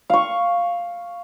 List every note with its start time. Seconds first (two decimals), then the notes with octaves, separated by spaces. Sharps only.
0.10 F5 C#6